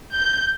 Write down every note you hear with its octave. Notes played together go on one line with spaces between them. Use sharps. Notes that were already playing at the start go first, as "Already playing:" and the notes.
G6